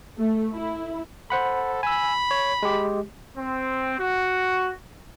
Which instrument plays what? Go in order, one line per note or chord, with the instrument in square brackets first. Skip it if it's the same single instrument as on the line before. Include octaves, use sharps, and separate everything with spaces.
[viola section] A3
E4
[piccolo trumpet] A4 [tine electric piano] C5 F#5 B5
[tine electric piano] G#5 E6 [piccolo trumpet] B5
[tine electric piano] C#5
G#3 G4
[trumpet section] C4
F#4